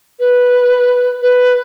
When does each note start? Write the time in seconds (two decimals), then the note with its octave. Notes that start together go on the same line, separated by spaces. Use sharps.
0.20 B4
1.22 B4